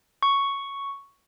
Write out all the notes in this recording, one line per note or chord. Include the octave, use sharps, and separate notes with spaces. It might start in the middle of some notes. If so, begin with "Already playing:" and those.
C#6